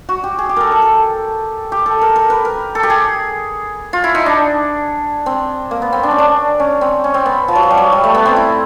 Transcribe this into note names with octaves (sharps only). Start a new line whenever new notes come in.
F#4
G4
G#4
G4
A4 A#4
A4
A4
G4
A4
A#4
A#4
B4
A#4
A4
G4
G#4
F4
E4
D#4
D4
C4
A#3
B3
C4
D4
C#4
D4
C#4
C4
C#4
C4
B3
F3
F#3
F3
G3
F#3
G3
A3
B3
C4
E4